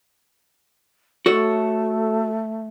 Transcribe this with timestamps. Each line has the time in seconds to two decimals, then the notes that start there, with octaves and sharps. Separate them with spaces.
1.26 A3 F#4 A4 C#5